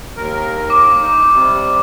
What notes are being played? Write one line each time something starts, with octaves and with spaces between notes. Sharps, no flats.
D#2 A#4
D6
D#4
C3 G3